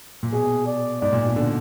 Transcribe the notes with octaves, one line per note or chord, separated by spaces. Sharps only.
A#2
B2 G#4
D5
G#2 D5
A#2
B2
D3